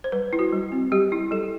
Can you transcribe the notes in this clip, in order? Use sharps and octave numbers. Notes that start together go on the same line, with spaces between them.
C5
G3 B4
E4
F#4
G3
C4
G3 G4
E4
G3 A4